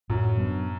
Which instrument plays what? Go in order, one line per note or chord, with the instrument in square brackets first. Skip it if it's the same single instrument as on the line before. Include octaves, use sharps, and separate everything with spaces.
[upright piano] F#2 [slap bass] A2
[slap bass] F#3 B3 D4